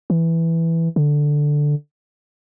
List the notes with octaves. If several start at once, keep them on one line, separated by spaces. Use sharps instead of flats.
E3
D3